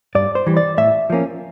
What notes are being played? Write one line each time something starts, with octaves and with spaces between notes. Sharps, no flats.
G2 D5
C5
E3 G3
D5
A2 E5
F3 A#3 C#4